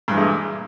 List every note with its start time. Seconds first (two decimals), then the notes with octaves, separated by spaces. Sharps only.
0.08 G2
0.11 E3
0.14 G#3
0.17 A3
0.20 A#2